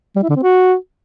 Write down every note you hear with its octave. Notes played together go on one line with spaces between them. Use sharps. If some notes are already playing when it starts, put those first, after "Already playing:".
G3
E4
D3
C4
F#4